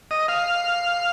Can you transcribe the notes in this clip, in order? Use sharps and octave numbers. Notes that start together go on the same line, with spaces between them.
D#5
F5